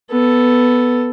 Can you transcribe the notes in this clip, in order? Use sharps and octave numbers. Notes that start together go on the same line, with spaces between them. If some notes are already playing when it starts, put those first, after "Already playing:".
B3 A4